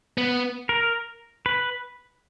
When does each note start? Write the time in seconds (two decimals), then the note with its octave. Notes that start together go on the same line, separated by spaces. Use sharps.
0.18 B3
0.69 A#4
1.46 B4